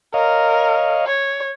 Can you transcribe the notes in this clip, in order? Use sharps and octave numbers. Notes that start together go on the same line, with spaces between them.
A#4 C#5 D#5 F5
C#5